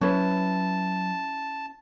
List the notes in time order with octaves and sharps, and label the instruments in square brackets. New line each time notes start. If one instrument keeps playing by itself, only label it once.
[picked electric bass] F#3 [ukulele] C#4 E4 B4 [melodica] A5